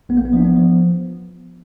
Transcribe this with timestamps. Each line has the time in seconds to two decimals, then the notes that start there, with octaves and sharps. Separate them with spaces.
0.09 A#1 B3
0.17 A#3
0.25 B3
0.33 F3 D4
0.45 B3
0.56 F3